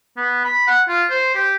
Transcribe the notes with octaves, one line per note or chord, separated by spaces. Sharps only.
B3
B5
F#5
F4
C5
G4